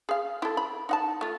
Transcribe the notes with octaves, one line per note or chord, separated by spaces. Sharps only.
G#4 F5
E4 A4
B5
D#4 F#5 A5
A3 F4